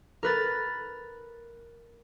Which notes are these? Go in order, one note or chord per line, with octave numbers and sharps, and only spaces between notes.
A#4 B4 A6